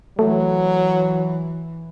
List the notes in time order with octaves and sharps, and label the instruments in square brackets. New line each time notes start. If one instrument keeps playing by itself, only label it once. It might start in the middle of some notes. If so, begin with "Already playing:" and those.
[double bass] E3 [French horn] F#3 [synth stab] A3